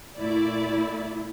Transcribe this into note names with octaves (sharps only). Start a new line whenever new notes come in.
A#2 A3 E4 D5